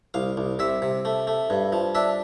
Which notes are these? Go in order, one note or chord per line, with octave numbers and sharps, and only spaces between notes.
C2 F5
C2
C3 E5
C3
A3
A3
G2
F3
D4 E5